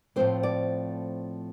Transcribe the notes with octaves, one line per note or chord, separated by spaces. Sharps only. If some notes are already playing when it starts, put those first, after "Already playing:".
A2 F3 A3 C4 C5
D5